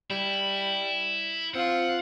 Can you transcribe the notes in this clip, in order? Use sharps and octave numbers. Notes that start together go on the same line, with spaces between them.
G3 E4
C4 F4 F#5